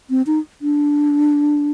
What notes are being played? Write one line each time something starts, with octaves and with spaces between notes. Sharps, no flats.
C4
D#4
D4